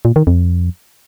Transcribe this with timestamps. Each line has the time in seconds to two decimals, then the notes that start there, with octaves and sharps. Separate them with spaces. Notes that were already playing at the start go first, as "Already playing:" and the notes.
0.05 A#2
0.16 D#3
0.27 F2